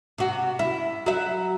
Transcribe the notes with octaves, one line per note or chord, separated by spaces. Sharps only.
C3 F#4
E4
F#3 E5